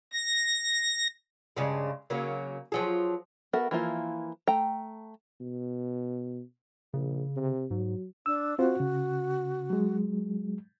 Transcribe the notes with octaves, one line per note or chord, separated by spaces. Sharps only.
A#6
G2 C#3 G#3
C#3 F#3 A#3
F3 F#3 G#4
B3 F#4 A4 A#4 E5
E3 F3 A#3 E4 F4
A3 G5 A#5
B2
A#1 C#3
C3
G#2 F#3
D4 E6
C4 F4 F#4 C5
C#3
F#3 G#3